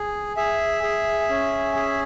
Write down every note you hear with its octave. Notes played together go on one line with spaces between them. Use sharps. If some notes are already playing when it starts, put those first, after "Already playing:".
Already playing: G#4
G#4 E5
G#4
C#4
G#4